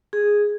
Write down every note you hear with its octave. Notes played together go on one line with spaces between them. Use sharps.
G#4